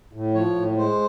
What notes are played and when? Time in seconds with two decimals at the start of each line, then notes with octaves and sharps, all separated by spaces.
0.13 A2
0.34 F3 C#5
0.55 A2
0.76 G#3 C5